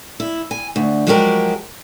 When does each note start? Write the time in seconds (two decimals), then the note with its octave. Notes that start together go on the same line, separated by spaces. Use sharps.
0.20 E4
0.51 G#5
0.76 D2
1.07 F3 F#3 G#3 F#4 G4 A#4